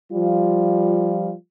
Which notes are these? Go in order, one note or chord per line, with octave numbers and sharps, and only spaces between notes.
F3 G3 F4